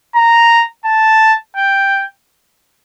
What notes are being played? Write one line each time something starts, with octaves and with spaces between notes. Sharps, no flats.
A#5
A5
G5